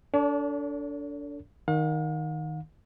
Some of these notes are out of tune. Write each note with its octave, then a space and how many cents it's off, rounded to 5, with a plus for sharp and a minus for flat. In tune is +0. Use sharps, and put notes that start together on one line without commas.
D4 -25 A4 +30 C#5 +40
D#3 +0 F5 +45